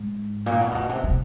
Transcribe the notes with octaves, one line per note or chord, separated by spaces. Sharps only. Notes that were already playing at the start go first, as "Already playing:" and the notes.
Already playing: G#2
A#2
B2
A#2
B2
C3
C3